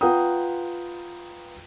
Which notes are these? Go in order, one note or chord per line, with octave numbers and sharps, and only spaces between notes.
F4 B4 F#5 G5 A#5 D#6